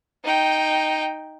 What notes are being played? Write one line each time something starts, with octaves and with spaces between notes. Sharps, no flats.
D#4 G5